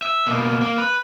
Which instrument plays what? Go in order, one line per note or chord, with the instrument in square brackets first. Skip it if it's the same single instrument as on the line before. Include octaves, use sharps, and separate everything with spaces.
[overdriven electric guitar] E5
B2 A#3
A#3
B4